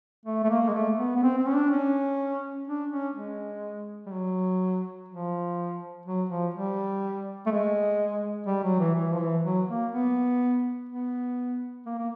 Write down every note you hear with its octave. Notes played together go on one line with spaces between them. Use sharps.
A3
A3
A#3
G#3
A3
B3
B3
C4
C4
C#4
D4
C#4
D4
C#4
G#3
G3
F#3
F3
F#3
F3
G3
A3
G#3
G3
F#3
E3
E3
F3
E3
F#3
A#3
B3
B3
A#3
A#3